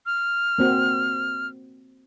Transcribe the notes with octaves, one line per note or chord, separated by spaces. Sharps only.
F6
A#3 C4 F#4